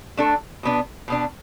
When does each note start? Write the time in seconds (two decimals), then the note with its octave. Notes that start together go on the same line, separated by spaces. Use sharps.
0.17 A3 D4 A4
0.63 B2 B3 D4
1.08 B2 B3 D4